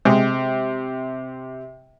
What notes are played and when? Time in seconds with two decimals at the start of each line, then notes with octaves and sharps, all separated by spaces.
0.05 C3 G#3